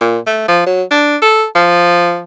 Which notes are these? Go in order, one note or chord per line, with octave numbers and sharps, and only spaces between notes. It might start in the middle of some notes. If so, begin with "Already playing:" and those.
A#2
A3
F3
F#3
D4
A4
F3